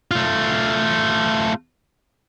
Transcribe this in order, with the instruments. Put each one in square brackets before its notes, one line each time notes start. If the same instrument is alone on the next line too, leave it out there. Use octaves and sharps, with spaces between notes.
[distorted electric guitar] A3 F4